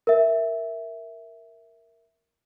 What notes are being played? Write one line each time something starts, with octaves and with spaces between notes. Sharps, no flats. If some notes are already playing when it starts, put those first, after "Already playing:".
A#4 E5